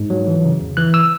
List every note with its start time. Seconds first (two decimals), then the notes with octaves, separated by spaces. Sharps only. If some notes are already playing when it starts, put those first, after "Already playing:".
Already playing: G#2
0.10 F#3
0.27 E3
0.44 C#3
0.60 E2
0.77 E3 F#6
0.94 E6